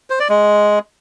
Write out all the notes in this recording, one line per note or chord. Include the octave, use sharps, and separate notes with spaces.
C5
D5
G#3